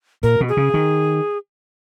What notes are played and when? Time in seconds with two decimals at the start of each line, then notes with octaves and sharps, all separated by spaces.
0.23 A#2 A#4
0.41 B2
0.49 G#4
0.57 C#3
0.74 D#3